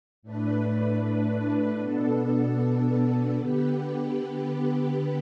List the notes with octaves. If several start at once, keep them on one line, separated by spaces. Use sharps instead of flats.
A2 A3 D4 B4
B2 B3 D4 A4
D3 B3 G4 B4